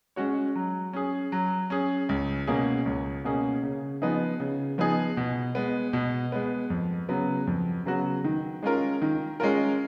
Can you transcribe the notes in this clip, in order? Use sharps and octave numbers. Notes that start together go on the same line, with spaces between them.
G#3 C#4 F#4 C#5
F#3
C#4 G#4
F#3
C#4 G#4
C#2
B2 A#3 C#4 G#4
C#2
B2 A#3 C#4 G#4
C#3
F3 B3 D#4 G#4
C#3
F3 B3 D#4 G#4
B2
G#3 B3
B2
G#3 B3
F2
C#3 F#3 B3 F#4
F2
C#3 F#3 B3 F#4
D#3
G#3 C#4 F4 A#4
D#3
G#3 C#4 F4 A#4